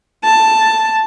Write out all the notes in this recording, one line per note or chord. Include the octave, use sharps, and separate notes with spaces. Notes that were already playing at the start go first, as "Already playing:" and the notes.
A5